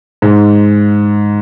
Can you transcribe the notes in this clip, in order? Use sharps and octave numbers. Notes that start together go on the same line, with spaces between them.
G#2